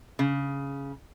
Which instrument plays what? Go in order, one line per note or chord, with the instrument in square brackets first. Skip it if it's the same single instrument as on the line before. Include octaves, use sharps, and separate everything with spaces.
[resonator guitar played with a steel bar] C#3